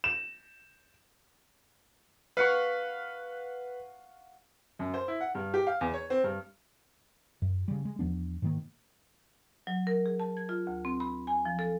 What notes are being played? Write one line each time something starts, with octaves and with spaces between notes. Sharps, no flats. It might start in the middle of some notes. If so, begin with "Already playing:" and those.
E7
B4 F5 F#5 C#6
F#2
C5
E4
F#5
G2
G4
F5
E2
C#5
C4
G2
F#2
C#3 G3
G#3
E2 F3 B3 D4
G#2 D#3 A#3
F#3
A#4
G#4
A5
G#6
F4
D2
C4
B5
G#5
F3
A4